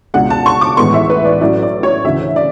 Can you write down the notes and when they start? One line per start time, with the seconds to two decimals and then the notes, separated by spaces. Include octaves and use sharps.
0.14 C#2 B2 G#3 D4 F#5
0.30 A5
0.46 C#6
0.61 D6
0.77 A1 A2 G#3 B3 C#6
0.94 E5
1.10 B4
1.25 D5
1.41 A2 F#3 C#4 E4 D5
1.63 D5
1.83 C#5
2.04 D2 C#3 E3 E5
2.36 D5